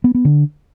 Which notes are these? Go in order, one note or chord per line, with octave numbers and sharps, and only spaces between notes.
B3
B3
D3